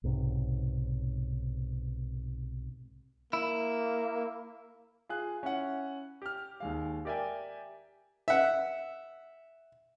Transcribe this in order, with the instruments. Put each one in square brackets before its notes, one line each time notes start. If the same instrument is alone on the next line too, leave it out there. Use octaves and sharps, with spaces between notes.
[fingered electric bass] B1 G#2 C3
[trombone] A#3 [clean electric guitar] E4
[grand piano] F4 G#4 F#6
C#4 E4 F#5
G4 F6
D#2 G#3 F5
G4 A#4 D5 E5 G5 G#5
[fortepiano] E5 F#5